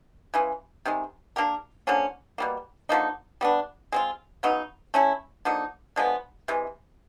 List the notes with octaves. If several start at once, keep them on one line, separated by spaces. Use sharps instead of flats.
C#3 E3 G#3
C3 D#3 G#3
A#3 D4 G4 A#4
D3 F3 A#3 C#4
B2 G3 A#3
D3 F3 A#3 D#4
G3 B3 D4
G#3 C4 F4
C#3 F#3 B3 D#4
A3 C#4 E4
D3 F3 A#3 D#4
D3 F3 G#3 B3
C3 E3 G#3